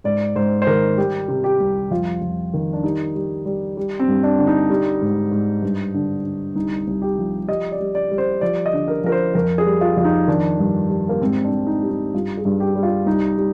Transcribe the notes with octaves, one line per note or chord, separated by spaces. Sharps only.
G#2 D5
G#2 C5
C5
D#3 A#4
G3 G4
C3
G4
C2
F2 F4
F2
D#3
D4
G3 D#4
G3
G3
G3
C4
G2
D4
D3
D#4
G3
G#2
G#2
G2
D3
D3
C2 D#4
C2
G4
F3
G3 D#5
D5
G3
D5
G3
C5
F3 D5
D#5
D3
A#4
F3 A#4
C5
F2 A#4
G#4
G3
F4
F2 F4
D#4
D#3 D4
G2
G3
A#3
G#2 C4
D4
G#2
D#4
G3
D#4
G2 F4
G#4
G2
G4
G3
F4
C2 D#4
G3